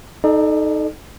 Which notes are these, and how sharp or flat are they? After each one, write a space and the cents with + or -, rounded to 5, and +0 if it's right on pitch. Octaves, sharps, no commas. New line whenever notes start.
D#4 +0 A4 -20 D5 +40